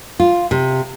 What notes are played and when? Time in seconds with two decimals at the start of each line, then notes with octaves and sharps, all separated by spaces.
0.20 F4
0.51 C3